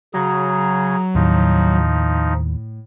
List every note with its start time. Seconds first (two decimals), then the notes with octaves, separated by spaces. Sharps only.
0.14 C#3 F#3 G#4 A#5
1.15 D#2 A2 F3 D#4